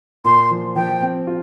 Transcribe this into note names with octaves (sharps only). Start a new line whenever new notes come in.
A#2 C6
F3
F3 G5
C4
F4